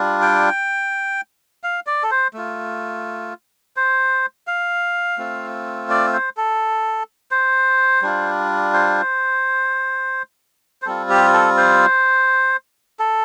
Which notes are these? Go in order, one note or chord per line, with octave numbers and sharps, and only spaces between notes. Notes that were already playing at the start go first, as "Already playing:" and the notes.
Already playing: G3 D4 F4
G5
F5
D5
A4
C5
A3 F4
C5
F5
A3 C4 F4
D5
C5
A4
C5
G3 D4 F4
C5
C5
G3 C4 F4 A4
G4
A4
C5
A4